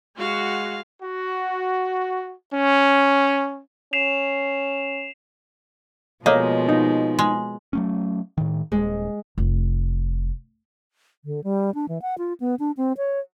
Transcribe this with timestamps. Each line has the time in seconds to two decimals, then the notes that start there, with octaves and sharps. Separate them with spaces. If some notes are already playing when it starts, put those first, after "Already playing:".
0.17 G#3 F#4 F5
1.03 F#4
2.53 C#4
3.93 C#4 C7 E7 F7
6.26 B2 F3 G#3 A#3 A4 C#5 D#5 F5
6.69 D#4
7.19 G#3
7.73 F#3 A3 C#4
8.38 A2 D#3
8.72 D#1 G#3
9.38 F1
11.25 D3
11.44 G3
11.74 D4
11.89 E3
12.02 F#5
12.18 F4
12.40 B3
12.59 D4
12.77 C4
12.97 C#5